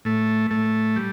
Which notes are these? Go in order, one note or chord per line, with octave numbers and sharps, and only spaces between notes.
A2 A3
A2 A3
G3